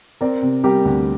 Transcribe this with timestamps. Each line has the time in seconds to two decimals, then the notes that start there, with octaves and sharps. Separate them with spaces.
0.21 C4 A#4 D5
0.42 C3
0.64 G3 G4 A#4
0.85 D2